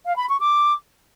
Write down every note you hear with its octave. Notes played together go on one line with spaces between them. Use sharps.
F5
B5
C#6
D6